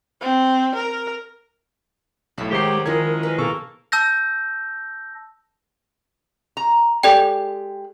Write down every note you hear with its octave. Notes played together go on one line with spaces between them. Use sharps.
C4
A#4
B1 A2 A5 B5
D#3 F#3 G#3 G4 C5 C7
D#3 F3 G#3 C#4 E4 A#4 G#6
B4
B2 A#3 G#4 A4 C#6
A5 E6 G6 A#6
A#5
G#3 G4 A4 D5 G5